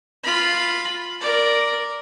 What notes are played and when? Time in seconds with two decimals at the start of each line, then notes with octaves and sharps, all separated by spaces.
0.23 F4 B5
1.21 A#4 D5